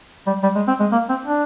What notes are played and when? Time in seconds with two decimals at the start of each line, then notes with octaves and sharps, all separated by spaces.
0.27 G3
0.43 G3
0.55 G#3
0.68 C4
0.80 G#3
0.92 A#3
1.09 C4
1.25 D4